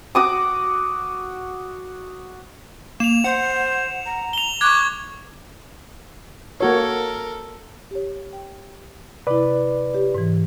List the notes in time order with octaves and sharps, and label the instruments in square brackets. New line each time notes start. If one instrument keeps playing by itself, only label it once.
[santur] F#4 D6 D#6
[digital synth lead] A#3 [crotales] E7 F7
[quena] C5 [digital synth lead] F#5
[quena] A#5
[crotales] F7 G7
[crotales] C#6 G#6 [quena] D6 [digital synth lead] F#6
[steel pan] A#3 F#4 C#5 [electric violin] A4 A#4
[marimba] G4 C#5
G5
[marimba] C3 E4 [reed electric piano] B4 D5
[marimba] G4 C#5
G#2 E3